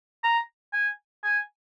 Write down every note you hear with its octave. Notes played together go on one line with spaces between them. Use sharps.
A#5
G#5
G#5